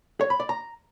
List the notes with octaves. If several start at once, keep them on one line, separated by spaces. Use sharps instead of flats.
C#5
B5
D5
A#5